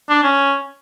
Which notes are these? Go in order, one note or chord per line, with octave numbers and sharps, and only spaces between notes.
D4
C#4